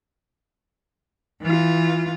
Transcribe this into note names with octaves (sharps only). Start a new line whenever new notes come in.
E3 F4